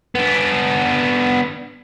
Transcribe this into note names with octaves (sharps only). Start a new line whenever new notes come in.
B3 D4